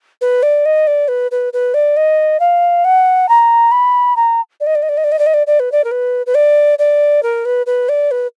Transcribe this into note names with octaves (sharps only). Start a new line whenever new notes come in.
B4
D5
D#5
D5
B4
B4
B4
D5
D#5
F5
F#5
A#5
B5
A#5
D5
D#5
D5
D#5
D5
D#5
D5
D#5
D5
D#5
D5
D5
B4
D5
A#4
B4
B4
D5
D5
A#4
B4
B4
D5
B4